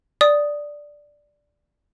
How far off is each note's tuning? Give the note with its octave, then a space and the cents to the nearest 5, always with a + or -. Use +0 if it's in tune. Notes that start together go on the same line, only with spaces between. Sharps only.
D5 +0 D#6 +0